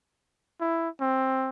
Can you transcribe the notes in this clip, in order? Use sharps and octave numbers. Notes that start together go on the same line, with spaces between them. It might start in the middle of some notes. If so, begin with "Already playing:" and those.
E4
C4